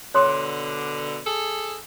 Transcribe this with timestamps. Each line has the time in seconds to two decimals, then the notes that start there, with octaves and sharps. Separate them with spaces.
0.14 B2 D3 C#5 C6 D#6
1.26 G#4 A4